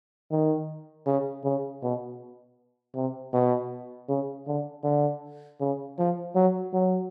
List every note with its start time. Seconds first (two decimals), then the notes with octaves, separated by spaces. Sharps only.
0.31 D#3
1.06 C#3
1.44 C#3
1.83 B2
2.95 C3
3.33 B2
4.09 C#3
4.47 D3
4.84 D3
5.60 C#3
5.98 F3
6.35 F#3
6.73 F#3